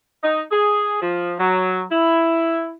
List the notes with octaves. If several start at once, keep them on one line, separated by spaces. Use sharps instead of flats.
D#4
G#4
F3
F#3
E4